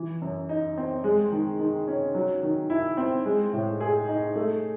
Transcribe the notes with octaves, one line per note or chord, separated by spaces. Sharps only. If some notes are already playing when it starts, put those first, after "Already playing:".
Already playing: E3
F#2
D#4
C4
G#3
D#3
D#3
C#4
F#3
D#3
E4
C4
G#3
A2
G#4
D#4
A3